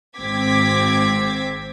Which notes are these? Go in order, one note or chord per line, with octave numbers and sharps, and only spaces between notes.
G#1 G#2 C4 D6 G#6 B6